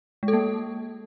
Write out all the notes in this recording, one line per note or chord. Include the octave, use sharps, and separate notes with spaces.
G#3
A4
A#3